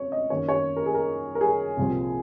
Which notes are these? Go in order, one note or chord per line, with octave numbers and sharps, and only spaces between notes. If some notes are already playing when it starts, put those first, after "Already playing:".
Already playing: F2 C#3 C#5
D#5
F#2 D#3 A#3 C#5
C#5
A#4
G#4
A#4
A#4
G#4
C2 A#2 F3 C4